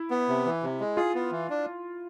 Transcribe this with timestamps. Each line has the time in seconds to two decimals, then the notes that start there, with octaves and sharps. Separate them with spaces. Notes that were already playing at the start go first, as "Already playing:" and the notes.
Already playing: E4
0.11 B3
0.28 C3
0.46 E3
0.63 C3
0.80 G#3
0.97 F4 G#4
1.15 B3
1.31 E3
1.50 D4